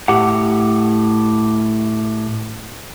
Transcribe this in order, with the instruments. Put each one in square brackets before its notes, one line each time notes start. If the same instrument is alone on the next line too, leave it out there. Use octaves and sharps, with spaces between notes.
[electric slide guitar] A2 G4 F#5